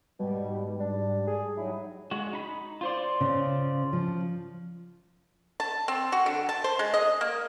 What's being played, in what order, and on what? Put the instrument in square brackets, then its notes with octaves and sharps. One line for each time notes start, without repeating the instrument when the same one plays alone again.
[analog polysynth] G#2 G3 [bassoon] B2
[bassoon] D4
G#4
[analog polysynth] F#3 G3 D#4 [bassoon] E4
[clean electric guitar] G#3 F#4
D#4 B5
F4 C5 D5
[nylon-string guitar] C#3
F3
[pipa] A5
C4
F#4
D3
A5
C5
G#3
D#5
A#3